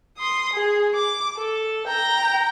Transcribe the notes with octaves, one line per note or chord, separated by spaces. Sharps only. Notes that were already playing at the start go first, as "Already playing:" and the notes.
C6 D#6
G#4
D6
A4
G5 A#5